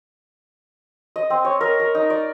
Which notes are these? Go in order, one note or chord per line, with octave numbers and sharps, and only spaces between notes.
D#5
C4
C#5
A#4
A#4
D#4
D5